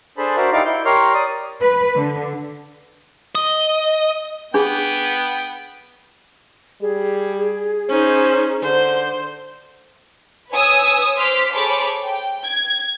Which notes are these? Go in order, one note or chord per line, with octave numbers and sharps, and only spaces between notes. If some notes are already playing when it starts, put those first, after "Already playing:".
D4 G#4 A4 C5 A5 B5
F#4 A#4 C5 D5 E5
D#4 E4 G4 D5 F5 D6
E4 G6
G4 A#4 C#5 C6 F6
D5 D#6
B4
D3
D#5
B3 D4 G#4 G5
G3 G#4
C#4 D#4 C5
D3 C5
B4 C#5 G#5 D#6 E6
C5 C6 D6 F6 B6
G#4 A4 C5 C#5 B5 D6
G5
G#6